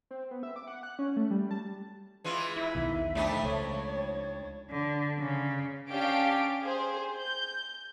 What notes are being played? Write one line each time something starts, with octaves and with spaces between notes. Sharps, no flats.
C4
B3
E5
D6
F#5
F#6
C#4
A3
G3
A5
E3 G#3 F4
E4 E5
B1 E2 D#3
F2 A3 D4 D#4
C#2 C#5
D3
C#3
C#4 D4 G4 F5 D7
G#4 C5
G6